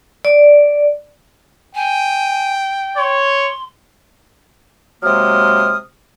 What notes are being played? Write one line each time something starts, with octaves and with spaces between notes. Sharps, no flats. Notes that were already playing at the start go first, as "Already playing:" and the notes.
D5
G5 G#5
C#5 C6
C3 F#3 G#3 A#3 D#6 F6